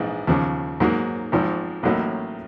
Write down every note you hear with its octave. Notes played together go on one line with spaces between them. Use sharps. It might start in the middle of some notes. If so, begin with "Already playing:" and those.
Already playing: A#1 G#2 E3 G#3
D#2 C#3 F3
G#2 D#3 F#3 A#3
G#1 G#2 F3
A1 A2 F#3 A#3 D#4